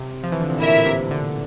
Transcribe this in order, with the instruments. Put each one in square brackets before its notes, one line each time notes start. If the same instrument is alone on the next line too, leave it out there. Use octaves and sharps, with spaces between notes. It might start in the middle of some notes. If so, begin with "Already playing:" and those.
Already playing: [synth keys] C3
F3
E3
D3
C3
[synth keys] A#2 [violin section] E4 A#4 E5
[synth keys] A2
A#2
C3
D3